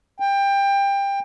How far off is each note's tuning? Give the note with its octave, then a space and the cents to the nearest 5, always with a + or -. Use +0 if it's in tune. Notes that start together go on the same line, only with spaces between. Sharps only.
G5 +20